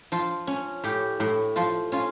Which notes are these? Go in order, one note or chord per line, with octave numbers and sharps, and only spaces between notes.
F3 F4
C#4
A2 G4
A2
F3 F4
C#4 F4